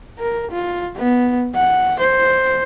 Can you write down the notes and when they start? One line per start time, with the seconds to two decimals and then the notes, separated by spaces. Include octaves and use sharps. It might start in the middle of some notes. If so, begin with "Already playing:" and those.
0.19 A#4
0.52 F4
0.96 B3
1.55 F#5
2.00 C5